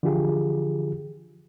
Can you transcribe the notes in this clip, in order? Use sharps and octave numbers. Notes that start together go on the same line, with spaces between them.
D3 E3 F3 F4 G4 G#4